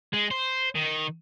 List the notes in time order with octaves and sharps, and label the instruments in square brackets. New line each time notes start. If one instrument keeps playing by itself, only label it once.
[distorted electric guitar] G#3
C5
D#3